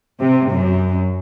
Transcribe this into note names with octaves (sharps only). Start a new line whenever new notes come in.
C3
F#2